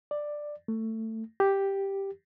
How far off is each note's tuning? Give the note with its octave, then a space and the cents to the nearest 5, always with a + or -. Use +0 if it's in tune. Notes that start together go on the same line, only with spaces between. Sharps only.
D5 +10
A3 +20
G4 +0